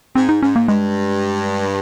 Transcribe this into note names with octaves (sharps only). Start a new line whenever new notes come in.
G#2 C4
D#4
G#2 C#4
A#3
G2 G#3